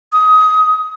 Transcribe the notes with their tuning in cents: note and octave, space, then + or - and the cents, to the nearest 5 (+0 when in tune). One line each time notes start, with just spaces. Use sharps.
D#6 +20